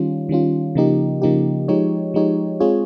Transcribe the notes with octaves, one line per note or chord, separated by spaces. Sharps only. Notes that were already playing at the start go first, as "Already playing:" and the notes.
Already playing: D#3 G3 C#4 F4
D#3 G3 C#4 F4
C#3 F3 A#3 D#4 G4
C#3 F3 A#3 D#4 G4
F3 G#3 D#4 G4 C#5
F3 G#3 D#4 G4 C#5
G#3 C4 F4 G#4 C#5